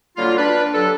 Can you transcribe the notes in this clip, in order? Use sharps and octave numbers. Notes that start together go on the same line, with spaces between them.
D3 F#3 G3 A#3 F4
D4 B4
G2 D3 F#3 D4 A4